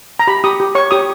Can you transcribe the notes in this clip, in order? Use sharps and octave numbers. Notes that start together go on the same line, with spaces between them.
A#5
G4 B5
G4 D#6
G4
C#5 C#6
G4 D#6